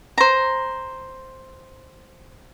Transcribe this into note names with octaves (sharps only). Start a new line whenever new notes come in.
C5 A#5